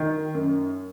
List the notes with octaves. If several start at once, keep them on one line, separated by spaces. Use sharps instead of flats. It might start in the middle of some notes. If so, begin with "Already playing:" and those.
Already playing: D#3
F#2